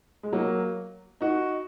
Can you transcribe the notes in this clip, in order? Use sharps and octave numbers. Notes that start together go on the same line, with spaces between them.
G#3
F#3 A#3
D#4 F#4